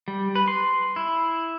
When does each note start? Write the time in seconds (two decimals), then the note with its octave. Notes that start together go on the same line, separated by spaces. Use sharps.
0.08 G3
0.35 B4
0.48 C6
0.96 E4